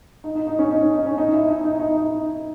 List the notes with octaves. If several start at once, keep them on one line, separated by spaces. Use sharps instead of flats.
D#4
D#4
D#4
C#4
D#4
C#4
D#4
C#4
D#4
E4
D#4
D#4
D#4
D#4